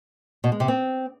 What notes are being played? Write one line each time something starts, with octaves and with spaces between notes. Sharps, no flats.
B2
G#3
C3
C4